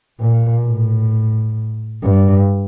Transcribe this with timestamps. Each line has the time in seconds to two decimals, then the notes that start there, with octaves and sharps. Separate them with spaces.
0.20 A#2
0.65 A2
2.02 G2